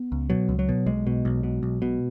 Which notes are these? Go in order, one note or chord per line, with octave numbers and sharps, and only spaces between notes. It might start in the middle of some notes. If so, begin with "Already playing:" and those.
Already playing: B3
C#2
B2 F#3
C#2
F#3
B2
B1 G#3
B2
B1
B2
B1
B2